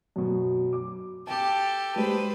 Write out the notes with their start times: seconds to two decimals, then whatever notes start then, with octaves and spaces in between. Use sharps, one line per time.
0.16 F#2 B2
0.73 D6
1.27 G4 A4 G5 D6
1.96 G3 G#3 B4 C5